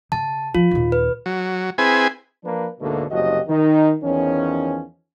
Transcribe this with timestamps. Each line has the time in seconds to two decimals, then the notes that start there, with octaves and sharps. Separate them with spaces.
0.12 C#3 A5
0.55 F3 F4
0.71 D#2 A#2
0.92 B4
1.26 F#3
1.78 C4 E4 G#4 B4 G#5
2.44 F3 A#3 D4 B4
2.80 D2 G#2 B2 D3 A3 A#3
3.10 F#1 C2 F3 F#4 G4 D#5
3.47 D#3 D#4
4.03 E2 D#3 F3 C#4